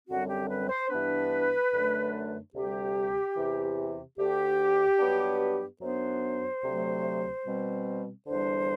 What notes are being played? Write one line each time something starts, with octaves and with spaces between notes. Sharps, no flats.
F#2 D3 G3 C4 F#4
G4
B4
C5
G2 E3 B3 D4 B4
F#2 D3 A3 D4
D2 C3 G3 G4
E2 C3 E3
D2 D3 A3 G4
G2 F#3 B3 D4
F#2 F#3 B3 D4 C5
D2 C3 F#3 A3
B2 G3 C4
E2 D3 G3 D4 C5